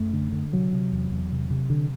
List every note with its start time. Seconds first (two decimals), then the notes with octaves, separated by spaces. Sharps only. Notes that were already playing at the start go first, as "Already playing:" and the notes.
Already playing: F#2 A3
0.13 D3
0.32 D3
0.53 C3 F#3
0.73 C3
0.92 E2
1.11 E2
1.32 C3
1.51 C3
1.70 D3